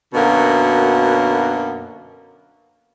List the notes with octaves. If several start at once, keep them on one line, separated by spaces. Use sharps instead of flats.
F#2 B2 D3 A#3